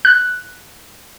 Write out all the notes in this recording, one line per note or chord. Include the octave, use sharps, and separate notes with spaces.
F#6